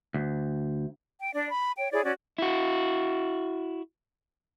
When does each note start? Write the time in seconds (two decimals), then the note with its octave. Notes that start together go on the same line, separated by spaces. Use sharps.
0.14 D2
1.19 G5
1.34 D4 D5
1.50 B5
1.77 C#5 G5
1.91 E4 G#4 C#5 D5
2.03 C#4 F#4 D5
2.38 E4 F#4